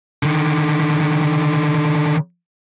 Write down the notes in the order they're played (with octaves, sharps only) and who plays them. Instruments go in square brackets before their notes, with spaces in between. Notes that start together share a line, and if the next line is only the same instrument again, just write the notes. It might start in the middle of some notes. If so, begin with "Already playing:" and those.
[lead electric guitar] D3 D#3